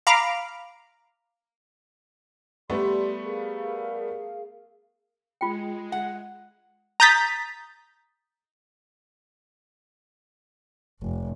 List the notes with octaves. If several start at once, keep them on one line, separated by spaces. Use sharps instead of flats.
F5 A#5 B5 D6 F6
G3 A3 B3 G4 D5 C6
G#4 A#4 F5
G#3 F4 G5
F#5
A#5 D#6 G6 A6 B6
F1